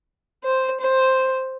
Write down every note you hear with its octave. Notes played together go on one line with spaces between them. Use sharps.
C5
C5